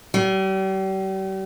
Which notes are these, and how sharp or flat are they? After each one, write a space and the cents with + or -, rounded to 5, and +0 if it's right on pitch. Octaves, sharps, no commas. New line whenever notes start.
G3 -40